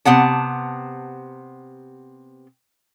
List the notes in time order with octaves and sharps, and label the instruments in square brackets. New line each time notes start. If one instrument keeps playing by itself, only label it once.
[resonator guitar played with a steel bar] C3 B3 F#5 A5